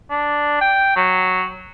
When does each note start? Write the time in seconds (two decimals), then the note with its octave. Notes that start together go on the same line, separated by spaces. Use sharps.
0.10 D4
0.61 G5
0.96 F#3